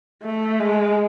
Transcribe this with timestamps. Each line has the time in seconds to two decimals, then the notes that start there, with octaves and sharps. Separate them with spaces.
0.23 A3
0.60 G#3